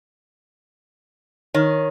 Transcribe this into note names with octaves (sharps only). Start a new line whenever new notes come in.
D#3 C#5